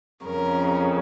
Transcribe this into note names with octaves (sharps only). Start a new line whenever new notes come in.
F2 C#3 A#4